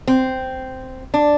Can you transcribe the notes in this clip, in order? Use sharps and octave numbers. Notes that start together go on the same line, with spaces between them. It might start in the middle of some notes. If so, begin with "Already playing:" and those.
C4
D4